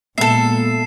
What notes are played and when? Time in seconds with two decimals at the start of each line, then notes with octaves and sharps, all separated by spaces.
0.18 A#2 G#3 A#3 B3 A4 E5 C7 E7